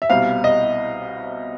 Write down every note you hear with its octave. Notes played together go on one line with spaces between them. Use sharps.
E5
C2 B2 G3 C4 F5
D#5